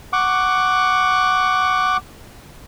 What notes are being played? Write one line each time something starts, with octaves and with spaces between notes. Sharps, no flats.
F#5 C#6 D6